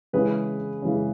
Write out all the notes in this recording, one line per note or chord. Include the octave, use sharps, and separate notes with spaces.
C#3 E3 G#3 C#4 G#4 B4
C#3 E3 G#3 C#4